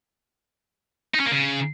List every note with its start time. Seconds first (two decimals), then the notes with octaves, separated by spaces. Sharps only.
1.14 D#4
1.20 C#4
1.26 A#3
1.31 C#3